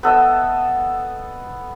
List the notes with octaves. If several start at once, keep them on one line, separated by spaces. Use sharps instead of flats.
B3 A4 D#5 E5